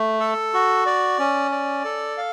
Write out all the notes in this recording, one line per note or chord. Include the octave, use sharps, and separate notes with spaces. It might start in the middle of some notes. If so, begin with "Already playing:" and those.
Already playing: A3
A4
F#4
D5
C#4
D5
A4
F5